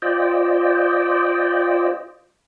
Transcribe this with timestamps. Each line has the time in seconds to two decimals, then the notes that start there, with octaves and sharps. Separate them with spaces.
0.02 F4 C5 D5 D#5 G5